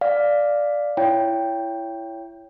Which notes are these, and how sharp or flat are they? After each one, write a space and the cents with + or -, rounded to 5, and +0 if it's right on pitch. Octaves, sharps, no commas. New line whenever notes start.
D5 +0 F5 +0
E4 +20 C#5 +15 G5 +0